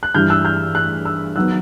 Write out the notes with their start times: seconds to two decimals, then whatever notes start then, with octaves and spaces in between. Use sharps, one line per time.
0.03 F#6
0.15 G2 E3 G3 F6 G6
0.30 E6 F#6
0.45 F6 G6
0.75 E6 F#6
1.05 E6 F#6
1.35 D#3 F#3 B3 E6 F#6